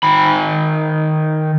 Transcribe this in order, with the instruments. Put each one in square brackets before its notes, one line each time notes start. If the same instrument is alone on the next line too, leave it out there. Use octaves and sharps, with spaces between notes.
[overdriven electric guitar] D#3 B5